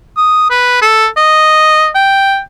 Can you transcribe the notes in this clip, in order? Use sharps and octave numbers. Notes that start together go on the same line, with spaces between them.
D#6
B4
A4
D#5
G5